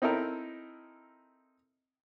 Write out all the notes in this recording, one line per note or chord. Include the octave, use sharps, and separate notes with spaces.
C4 D#4 E4 A4 A#4